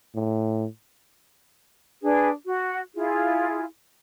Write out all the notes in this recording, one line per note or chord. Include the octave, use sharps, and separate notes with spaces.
A2
D4 G#4 B4
F#4
E4 F4 G#4